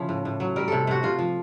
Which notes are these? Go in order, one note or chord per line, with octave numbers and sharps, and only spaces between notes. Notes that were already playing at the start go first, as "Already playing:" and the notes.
Already playing: C#3 F3 E4
A2
A2
F#3
G3 A#4
C3 A4
C3 F#4
C3 F4
F3